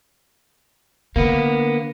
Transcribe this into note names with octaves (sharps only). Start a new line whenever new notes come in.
D3 A#3 B3